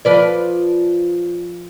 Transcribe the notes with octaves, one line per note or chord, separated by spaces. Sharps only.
F3 B4 D5